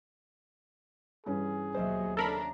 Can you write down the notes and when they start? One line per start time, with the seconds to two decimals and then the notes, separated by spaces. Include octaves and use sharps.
1.26 G2 E3 C#4 G#4
1.74 D#2 B2 F#3 C5 D#5 E5
2.17 C#3 D4 A4 A#4 A#5 B5